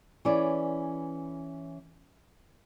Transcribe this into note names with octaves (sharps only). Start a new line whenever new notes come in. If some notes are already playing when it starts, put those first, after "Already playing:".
E3 C#4 G#4 B4 D5